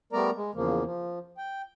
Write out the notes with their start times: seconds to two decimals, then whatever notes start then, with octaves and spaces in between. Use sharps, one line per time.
0.13 G3 A3 B3 A#4 D5 A#5
0.35 G#3
0.54 E2 C#3 F3 A#3
0.84 F3
1.37 G5